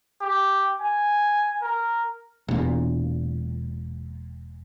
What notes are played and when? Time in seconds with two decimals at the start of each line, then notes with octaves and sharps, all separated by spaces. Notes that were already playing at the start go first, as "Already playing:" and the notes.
0.21 G4
0.81 G#5
1.62 A#4
2.48 E1 A#2